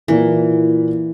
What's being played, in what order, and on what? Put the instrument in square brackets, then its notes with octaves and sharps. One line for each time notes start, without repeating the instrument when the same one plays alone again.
[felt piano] A#2 A#4 [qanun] E3